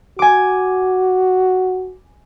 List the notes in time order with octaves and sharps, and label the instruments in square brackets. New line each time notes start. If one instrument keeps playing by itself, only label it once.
[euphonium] F#4 [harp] G#5 D6